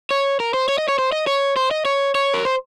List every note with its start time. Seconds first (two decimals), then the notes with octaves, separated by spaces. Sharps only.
0.11 C#5
0.40 A#4
0.54 C5
0.69 C#5
0.78 D#5
0.88 C#5
0.99 C5
1.12 D#5
1.27 C#5
1.56 C5
1.71 D#5
1.85 C#5
2.15 C#5
2.34 A#4
2.45 C5